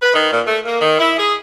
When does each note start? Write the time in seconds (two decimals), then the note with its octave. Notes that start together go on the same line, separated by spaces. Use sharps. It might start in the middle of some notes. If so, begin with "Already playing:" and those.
0.01 B4
0.13 D#3
0.31 A#2
0.46 A3
0.65 A#3
0.81 D#3
0.99 E4
1.18 G#4